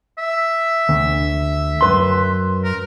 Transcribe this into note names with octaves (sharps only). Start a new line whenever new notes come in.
E5
D2
F#2 B4 C6
A#4